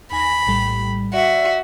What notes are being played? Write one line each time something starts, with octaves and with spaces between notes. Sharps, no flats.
D#2 G#5 B5 A#6
A#1 A2 G3
F#4 D5 E5